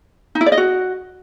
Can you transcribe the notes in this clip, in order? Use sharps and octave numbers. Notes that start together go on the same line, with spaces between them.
D#4
E4
D5
D#5
F#4